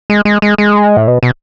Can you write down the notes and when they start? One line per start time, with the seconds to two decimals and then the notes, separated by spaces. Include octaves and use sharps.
0.10 G#3
0.25 G#3
0.42 G#3
0.58 G#3
0.97 A2
1.07 B2
1.23 B2